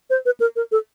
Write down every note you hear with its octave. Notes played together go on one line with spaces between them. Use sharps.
C5
B4
A#4
A#4
A4